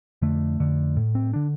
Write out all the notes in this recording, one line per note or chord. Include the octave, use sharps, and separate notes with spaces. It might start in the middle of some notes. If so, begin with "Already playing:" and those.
F2 D3 A3
F2 D3
A2
C4
D3 D4